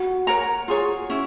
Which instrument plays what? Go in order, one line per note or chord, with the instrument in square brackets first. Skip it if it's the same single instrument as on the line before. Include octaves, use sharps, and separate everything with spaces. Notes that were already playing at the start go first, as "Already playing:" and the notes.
Already playing: [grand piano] F#4
[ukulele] A#4 C#5 F#5 A#5
F4 G#4 C#5
C#4 E4